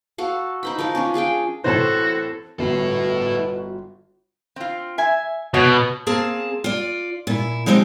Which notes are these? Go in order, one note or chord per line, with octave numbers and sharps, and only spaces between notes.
F#4 A4 F5
D#4 C5 B5
F3 A#4 F5
C#4 D4 F4
F4 G#4 F5 G5
A2 E3 C4 F#4 A4 C5 C#5 A5
G1 B2 D3 E4 F#4 A4 C7
C4 F4
E5 G#5
B2 B3 C#5
A#3 C4 G#4 A5
F4 D5
A#2 E4
F3 G#3 C4 D#4 G4